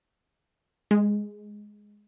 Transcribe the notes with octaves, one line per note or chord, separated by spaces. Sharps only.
G#3